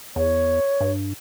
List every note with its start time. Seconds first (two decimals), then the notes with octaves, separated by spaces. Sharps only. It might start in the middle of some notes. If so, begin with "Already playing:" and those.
0.16 E2 C#5
0.81 G2